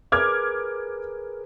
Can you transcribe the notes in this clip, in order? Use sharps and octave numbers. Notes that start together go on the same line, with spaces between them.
G#4 A#4 B4 D6 F6 G#6